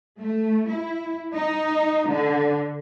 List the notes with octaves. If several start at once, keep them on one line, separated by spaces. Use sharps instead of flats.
A3
E4
D#4
D3